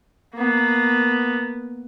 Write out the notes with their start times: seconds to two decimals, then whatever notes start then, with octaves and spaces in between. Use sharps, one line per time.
0.35 A#3 B3